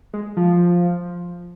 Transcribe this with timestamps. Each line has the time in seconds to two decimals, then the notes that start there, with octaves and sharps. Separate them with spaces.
0.13 G#3
0.37 F3